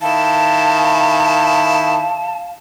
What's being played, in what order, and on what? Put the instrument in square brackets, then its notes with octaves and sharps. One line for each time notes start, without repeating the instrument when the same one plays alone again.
[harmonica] D#3 E4 [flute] F5 [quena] A5